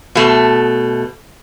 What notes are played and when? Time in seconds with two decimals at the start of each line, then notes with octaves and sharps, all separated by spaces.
0.15 B2 A3